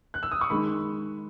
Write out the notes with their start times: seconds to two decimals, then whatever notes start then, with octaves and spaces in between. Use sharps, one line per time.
0.14 F#6
0.23 E6
0.31 D#6
0.41 C#6
0.50 D#3 G#3 D#4 B5